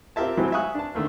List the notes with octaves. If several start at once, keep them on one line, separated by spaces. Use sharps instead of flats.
C4 F4 G4 A#4 E5 A5
F#3 G#3 A3 C4 E4
E5 F5 G#5 C#6 D#6 F#6
D4 A5
D3 D#3 A3 A#3